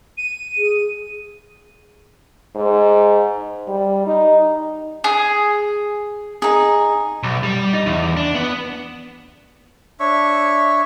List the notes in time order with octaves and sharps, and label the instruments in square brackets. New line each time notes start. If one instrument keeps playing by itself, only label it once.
[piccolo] D#7
[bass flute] G#4
[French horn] G#2
G3
D#4
[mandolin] G#4
[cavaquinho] D#4 G#4
[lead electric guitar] B1
G3
D#4
E2
D4
B3
[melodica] D4 C#5 E5 C#6